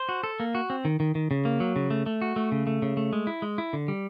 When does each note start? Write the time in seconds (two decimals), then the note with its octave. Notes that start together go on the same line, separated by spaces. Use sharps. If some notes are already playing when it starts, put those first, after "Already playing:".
Already playing: C5
0.09 F#4
0.24 A4
0.40 A#3
0.55 F#4
0.70 C4
0.85 D#3
1.00 D#3
1.15 D#3
1.31 C#3
1.45 A#3
1.60 F#3
1.76 C#3
1.90 A3
2.06 A3
2.22 F#4
2.36 A3
2.52 C#3
2.67 A3
2.82 C#3
2.97 A3
3.13 G#3
3.27 E4
3.42 G#3
3.58 E4
3.73 D3
3.88 G3